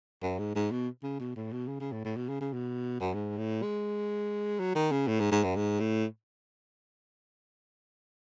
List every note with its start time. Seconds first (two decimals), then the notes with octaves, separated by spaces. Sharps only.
0.22 F#2
0.39 G#2
0.55 G#2
0.71 B2
1.03 C#3
1.20 B2
1.36 A2
1.52 B2
1.68 C#3
1.80 C#3
1.93 A2
2.05 A2
2.17 B2
2.29 C#3
2.41 C#3
2.53 B2
3.00 F#2
3.14 G#2
3.38 A2
3.62 G#3
4.59 F#3
4.75 D#3
4.92 C#3
5.08 A2
5.20 G#2
5.32 G#2
5.44 F#2
5.56 G#2
5.80 A2